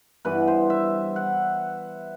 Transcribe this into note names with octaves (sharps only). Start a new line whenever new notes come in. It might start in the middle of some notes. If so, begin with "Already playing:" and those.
G2 E3 B3 B4
C5
E5
F#5